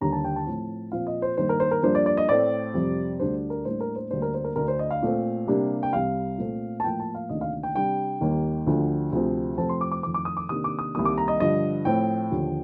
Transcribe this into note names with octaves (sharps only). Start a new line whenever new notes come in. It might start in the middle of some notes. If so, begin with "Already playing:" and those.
D#2 D3 G3 D4 A#5
A5
G5
A5
A2 F3 C4
A#2 F3 C4 F5
D#5
C5
G2 D#3 A#3 C5
A#4
C5
A#4
G2 F3 A#3 D4 C5
D5
D5
D#5
A2 A3 C4 D5
F2 C3 G3 C4
D2 D3 G3 D4 C5
A#4
A2 G3 A#3 D4 C5
A#4
C5
D2 D3 G3 A#3 D4 C5
A#4
C5
A#4
D2 D3 A3 D4 A#4
C5
D#5
F5
A#2 A3 C4
C3 G3 A#3 D4
G5
C2 C3 G3 F5
A#2 A3 C4
A5
A2 F3 A#3 G5
A5
F5
D2 C3 D#3 A#3 D4 D#5
F5
G5
C3 G3 D4 G5
D#2 D#3 G3 A#3
D2 D3 F3
D2 C3 F3 C4
F2 C3 F3 A3 C4 A5
C6
D6
D6
F2 D#3 A3 C4 D6
D6
D#6
D6
C3 D#3 A#3 D4 D#6
D6
D#6
C2 C3 D#3 G3 A#3 D#6
D6
A#5
D#5
G2 D3 F3 D#5
A2 F3 C4 G5
D#2 D3 F3